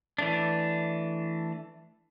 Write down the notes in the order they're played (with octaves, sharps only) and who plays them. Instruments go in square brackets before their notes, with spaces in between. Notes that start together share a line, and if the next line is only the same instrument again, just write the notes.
[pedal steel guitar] E3 A3 D4